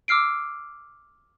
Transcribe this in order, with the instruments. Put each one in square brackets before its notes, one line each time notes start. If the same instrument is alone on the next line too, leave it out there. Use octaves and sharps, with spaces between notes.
[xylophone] D6 E6 F6 C7 D7